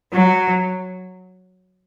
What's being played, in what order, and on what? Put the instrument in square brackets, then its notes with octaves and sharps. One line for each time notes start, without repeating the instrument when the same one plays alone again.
[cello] F#3